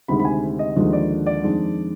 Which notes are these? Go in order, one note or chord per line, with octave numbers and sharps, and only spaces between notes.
D2 C3 D#3 G#3 B5
B5
G#5
D#5
D#2 D3 F3 G#3 D#5
D5
D5
F2 D#3 G#3 D4